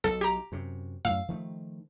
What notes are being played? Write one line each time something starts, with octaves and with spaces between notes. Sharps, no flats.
B1 A4
G4 A#5
F#2 C3
F#2 A2 F5 E6
D#3 F3 A3